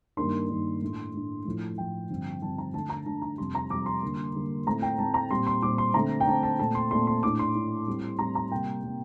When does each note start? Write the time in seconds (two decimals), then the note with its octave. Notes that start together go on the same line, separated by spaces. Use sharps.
0.17 G2 D#3 A#3 D4 C6
0.49 G2 D#3 A#3 D4
0.82 A2 A3 D4
1.14 A2 A3 D4
1.45 A2 F3 A3
1.78 A2 F3 A3 G5
2.10 G2 D3 F3 C4
2.42 G2 D3 F3 C4 A5
2.58 A#5
2.74 D3 A3 D4 A5
2.89 A#5
3.05 D3 A3 D4 A5
3.22 A#5
3.38 F2 C3 G3 C6
3.55 A#5
3.70 F2 C3 G3 D6
3.86 C6
4.03 D3 G3 A#3
4.34 D3 G3 A#3
4.67 A2 A3 C4 A#5
4.82 G5
4.98 A2 A3 C4 A5
5.14 A#5
5.30 A#2 G3 C4 C6
5.47 C6
5.62 A#2 G3 C4 D6
5.78 C6
5.94 D3 A3 C4 A#5
6.20 G5
6.27 D3 A3 C4 A5
6.43 A5
6.59 A#2 A3 C4 A5
6.75 C6
6.91 A#2 A3 C4 C6
7.07 C6
7.23 A2 A3 D4 D6
7.39 C6
7.55 A2 A3 D4
7.88 A2 G3 C4
8.19 A2 G3 C4 A#5
8.35 A#5
8.51 C3 G3 A#3 G5
8.84 C3 G3 A#3